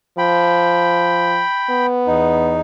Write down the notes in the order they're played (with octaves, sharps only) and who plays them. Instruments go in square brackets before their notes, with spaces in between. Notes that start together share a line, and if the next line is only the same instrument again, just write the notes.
[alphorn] F3 [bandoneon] G5 B5
[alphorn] B3
[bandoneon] E2 D#4